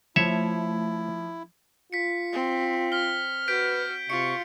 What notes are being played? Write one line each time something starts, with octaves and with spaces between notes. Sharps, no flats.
F3 A3 E4 C#5 E5
F4 B6 C#7
C4
F6 B6 G7
F#4 B4 G6 B6 D7
C3 F4 C#6 C#7